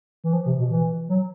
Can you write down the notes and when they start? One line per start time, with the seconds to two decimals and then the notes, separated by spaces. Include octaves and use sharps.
0.24 E3
0.33 F3
0.46 C3
0.59 B2
0.71 E3
1.09 F#3